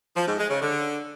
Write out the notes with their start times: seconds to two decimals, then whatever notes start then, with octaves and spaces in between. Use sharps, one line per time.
0.16 F3
0.27 G#2
0.39 G#3
0.50 C#3
0.61 D3